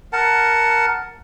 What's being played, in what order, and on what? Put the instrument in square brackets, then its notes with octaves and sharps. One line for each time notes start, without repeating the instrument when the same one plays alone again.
[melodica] A#4 F#5 A5